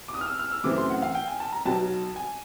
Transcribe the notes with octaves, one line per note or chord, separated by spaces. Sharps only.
D6
D#6
F6
E6
F6
E6
F#2 C#3 E3 A3 C4 D6
C6
F#5
F5
G5
G#5
A5
A#5
B1 B2 F#3 A5
G#5